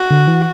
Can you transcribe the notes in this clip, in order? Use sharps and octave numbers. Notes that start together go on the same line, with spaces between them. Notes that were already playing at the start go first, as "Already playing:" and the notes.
Already playing: F#4
D3
E3